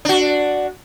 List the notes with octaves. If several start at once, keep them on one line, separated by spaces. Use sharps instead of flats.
D4 F#4